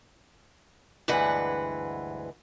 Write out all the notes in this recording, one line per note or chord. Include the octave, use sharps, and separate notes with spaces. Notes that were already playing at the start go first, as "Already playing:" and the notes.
D2 G2 E3 G#3 B4 F#5